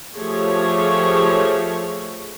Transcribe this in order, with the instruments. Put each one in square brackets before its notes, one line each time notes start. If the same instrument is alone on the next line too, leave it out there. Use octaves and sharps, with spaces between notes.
[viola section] F3 A3 G4 G#4 C#5